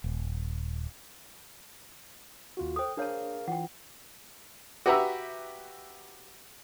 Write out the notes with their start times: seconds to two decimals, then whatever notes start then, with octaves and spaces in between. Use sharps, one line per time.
0.04 D#1
2.57 D#2 F4 F#4
2.76 A4 C5 G5 D#6
2.97 D4 G#4 A#4 C#5 F5 A5
3.48 E3 F4 F#5 G5
4.86 F#4 G4 B4 E5 A#5 E6